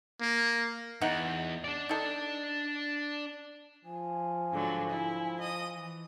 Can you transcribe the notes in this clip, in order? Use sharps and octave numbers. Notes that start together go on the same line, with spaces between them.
A#3
E2 D#4 F#5
D4 D5
D#4 A4
F3 G#5
G#2 D3 F#3
E4
D#5 D#6
E3